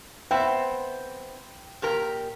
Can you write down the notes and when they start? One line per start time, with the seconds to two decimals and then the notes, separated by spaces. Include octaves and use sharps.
0.31 B3 C4 E5 G5
1.82 A#2 G4 A#4